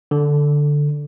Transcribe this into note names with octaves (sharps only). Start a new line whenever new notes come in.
D3